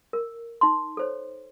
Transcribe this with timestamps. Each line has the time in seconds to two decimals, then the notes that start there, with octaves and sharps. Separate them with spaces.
0.13 A#4
0.61 D#4 C6
0.97 A4 C5 C#5